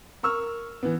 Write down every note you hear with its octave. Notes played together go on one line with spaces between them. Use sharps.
A#4 C#6 E6 F6
E3 B3